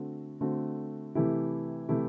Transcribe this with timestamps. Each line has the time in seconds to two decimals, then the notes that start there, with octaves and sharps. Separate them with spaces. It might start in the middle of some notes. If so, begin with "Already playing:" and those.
Already playing: D3 A3 C4 F#4
0.41 D3 A3 C4 F#4
1.15 C3 E3 A3 E4 G4
1.89 C3 E3 A3 E4 G4